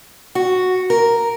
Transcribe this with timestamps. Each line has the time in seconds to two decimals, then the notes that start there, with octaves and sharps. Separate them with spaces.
0.35 F#4
0.90 A#4